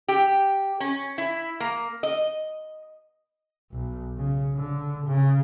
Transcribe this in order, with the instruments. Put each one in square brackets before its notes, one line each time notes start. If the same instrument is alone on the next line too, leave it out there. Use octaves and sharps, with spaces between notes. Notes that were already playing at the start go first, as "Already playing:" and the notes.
[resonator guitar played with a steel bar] G4
C#4
E4
A#3
D#5
[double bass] B1
C#3
D3
C#3